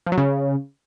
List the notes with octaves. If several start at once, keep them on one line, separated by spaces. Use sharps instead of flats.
F3
F#3
C#3